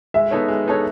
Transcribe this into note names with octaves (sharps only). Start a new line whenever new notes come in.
G#3 E5
B3 D#4 A4 C#5
G#3
B3 D#4 A4 C#5